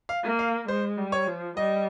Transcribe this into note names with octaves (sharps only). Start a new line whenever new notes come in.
F5
A#3
F5
G#3 C5
G3
C#5
F3
G3 D#5